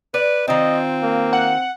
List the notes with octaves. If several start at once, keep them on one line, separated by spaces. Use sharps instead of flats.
B4 D5
D#3 C4 F4 D#5
A#3
F#5